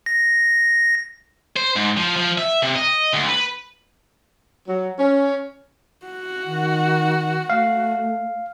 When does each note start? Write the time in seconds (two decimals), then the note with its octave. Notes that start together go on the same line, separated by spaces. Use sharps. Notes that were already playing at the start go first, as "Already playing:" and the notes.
0.06 A#6
1.56 C5
1.76 G#2
1.97 F3
2.16 F3
2.38 E5
2.63 C3
2.76 D#5
3.14 D2
3.29 B4
4.67 F#3
4.98 C#4
6.07 F#4
6.46 D#3
7.50 A3 F5